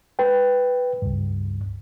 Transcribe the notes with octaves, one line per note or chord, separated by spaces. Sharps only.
B4 G5
C#2 G2